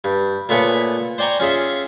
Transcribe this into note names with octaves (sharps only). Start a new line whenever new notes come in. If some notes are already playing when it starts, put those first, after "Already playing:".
G2
A#2 A3 B3 C#5 G#5 C#6
C5 D5 G5 G#5 A#5 C#6
C#4 F4 G#4 E5